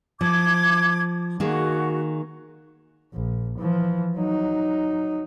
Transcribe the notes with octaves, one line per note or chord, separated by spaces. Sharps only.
F3 D6 G#6
D#3 A#3 F#4 G#4
A#1
E3 F3
F#3 D#4